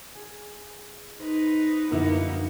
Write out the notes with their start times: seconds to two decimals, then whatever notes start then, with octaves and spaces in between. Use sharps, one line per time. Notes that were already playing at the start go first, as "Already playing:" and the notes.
0.15 G#4
1.19 D#4 B4 C5
1.91 F#2 D3 F3 A#3 B3 D#4 E4 A#4